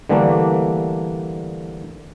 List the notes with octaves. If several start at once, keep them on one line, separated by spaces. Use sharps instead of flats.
D3 E3 G3 A3 A#3 D4